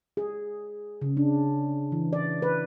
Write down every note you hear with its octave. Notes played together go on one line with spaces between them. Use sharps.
G#4
C#3
D4
E3
D5
B4